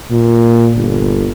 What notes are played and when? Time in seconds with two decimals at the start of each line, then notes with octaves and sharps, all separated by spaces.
0.11 A#2
0.76 G1